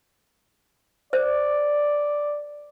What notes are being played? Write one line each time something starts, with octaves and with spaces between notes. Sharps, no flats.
C5 D5